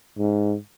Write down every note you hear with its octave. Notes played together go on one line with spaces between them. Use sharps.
G#2